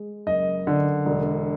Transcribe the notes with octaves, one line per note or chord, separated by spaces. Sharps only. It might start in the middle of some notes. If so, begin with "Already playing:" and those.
Already playing: G#3
F#1 D#5
D3
E1